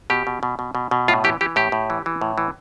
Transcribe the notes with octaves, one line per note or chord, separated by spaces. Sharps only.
B2 G4
B2
B2
B2
B2
B2
A2 F4
E3 G4
E3 G4
A2 G4
A2
E3
E3
A2
E3